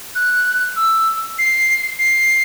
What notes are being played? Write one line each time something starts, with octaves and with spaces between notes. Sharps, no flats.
F#6
E6
C7
C7